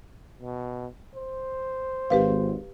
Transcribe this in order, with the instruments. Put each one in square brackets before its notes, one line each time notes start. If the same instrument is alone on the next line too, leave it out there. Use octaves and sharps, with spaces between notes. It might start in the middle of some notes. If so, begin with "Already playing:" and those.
[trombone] B2
C5
[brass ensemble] G#1 [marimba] G4 B4 F5